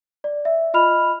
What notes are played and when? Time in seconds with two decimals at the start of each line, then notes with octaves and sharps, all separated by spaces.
0.24 D5
0.45 E5
0.74 F4 D#5 B5 F6 F7